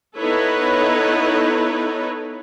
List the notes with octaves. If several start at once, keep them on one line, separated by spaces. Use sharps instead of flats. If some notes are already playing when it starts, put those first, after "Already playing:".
B3 D#4 E4 A4 B4 C#5